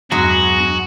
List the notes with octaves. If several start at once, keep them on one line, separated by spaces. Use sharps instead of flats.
E2 G2 F#3 G#3 F#4 A#6